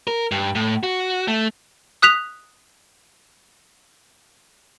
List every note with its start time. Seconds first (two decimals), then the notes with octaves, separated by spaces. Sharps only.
0.08 A#4
0.32 G2
0.55 A2
0.83 F#4
1.28 A3
2.02 D#6 F#6 B6 F7